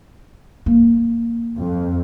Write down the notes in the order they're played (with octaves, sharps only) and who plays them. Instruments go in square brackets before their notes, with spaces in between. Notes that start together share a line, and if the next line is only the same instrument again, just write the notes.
[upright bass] A#3
[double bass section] F2